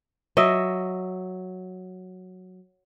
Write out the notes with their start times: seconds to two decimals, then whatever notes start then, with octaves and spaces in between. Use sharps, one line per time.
0.37 F#3 D#5 E5